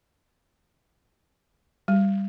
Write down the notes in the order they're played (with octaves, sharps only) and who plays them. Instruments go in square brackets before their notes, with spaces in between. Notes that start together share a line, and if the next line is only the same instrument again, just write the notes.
[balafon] G3